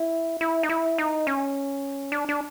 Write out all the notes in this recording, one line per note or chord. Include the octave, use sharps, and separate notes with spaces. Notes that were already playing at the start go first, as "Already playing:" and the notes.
Already playing: E4
E4
D#4
E4
D#4
C#4
D4
D4